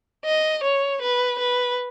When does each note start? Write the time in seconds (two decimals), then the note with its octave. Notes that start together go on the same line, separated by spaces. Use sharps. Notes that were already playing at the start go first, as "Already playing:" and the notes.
0.25 D#5
0.63 C#5
1.02 B4
1.39 B4